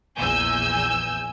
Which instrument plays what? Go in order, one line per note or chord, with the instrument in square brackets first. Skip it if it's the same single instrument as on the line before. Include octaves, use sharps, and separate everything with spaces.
[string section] A#1 E2 G#5 E6 G6